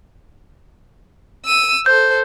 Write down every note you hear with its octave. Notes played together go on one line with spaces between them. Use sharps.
E6 D#7
A4 C5 G6